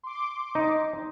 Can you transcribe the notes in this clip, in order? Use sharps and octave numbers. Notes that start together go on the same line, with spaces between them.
C6 D6
D#4